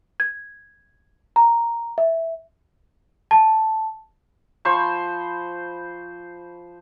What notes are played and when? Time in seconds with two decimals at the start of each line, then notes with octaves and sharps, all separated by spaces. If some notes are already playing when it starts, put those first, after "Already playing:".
0.20 G#6
1.36 A#5
1.98 E5
3.31 A5
4.65 F3 C5 B5 C#6